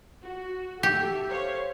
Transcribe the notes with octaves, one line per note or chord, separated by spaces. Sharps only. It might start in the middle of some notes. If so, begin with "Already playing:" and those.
F#4
G4 A4 E5
C5 C#5 F5